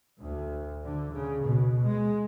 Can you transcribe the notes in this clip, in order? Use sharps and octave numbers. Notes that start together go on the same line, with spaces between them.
D2
D3
C#3
B2
G#3